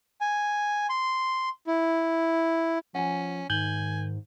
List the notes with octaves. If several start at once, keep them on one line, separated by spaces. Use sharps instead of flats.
G#5
C6
E4
F3 C#4 F#5 G#5
G#2 D#3 G#5 G6 F#7 G7